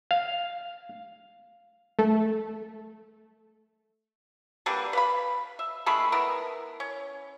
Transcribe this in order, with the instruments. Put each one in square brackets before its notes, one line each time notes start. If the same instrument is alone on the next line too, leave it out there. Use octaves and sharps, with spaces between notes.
[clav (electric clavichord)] F5
[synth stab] A3
[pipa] D3 G3 A#3 B4
B4 F5 B5
E5
D#3 G#3 A3 B5
B3 E4 A#4
C#4